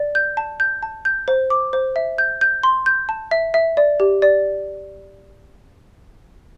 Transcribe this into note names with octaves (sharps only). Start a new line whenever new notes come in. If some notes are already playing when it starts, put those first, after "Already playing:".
Already playing: D5
G6
A5
G6
A5
G6
C5
D6
C5
E5
G6
G6
C6
G6
A5
E5
E5
D5
G4
D5